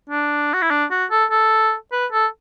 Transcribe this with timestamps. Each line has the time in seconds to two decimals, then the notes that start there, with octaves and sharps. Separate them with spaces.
0.09 D4
0.53 F#4
0.61 E4
0.70 D4
0.91 F#4
1.10 A4
1.31 A4
1.92 B4
2.12 A4